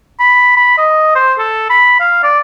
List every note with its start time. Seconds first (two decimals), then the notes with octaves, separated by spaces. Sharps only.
0.19 B5
0.57 B5
0.78 D#5
1.15 C5
1.38 A4
1.70 B5
2.00 F5
2.23 D5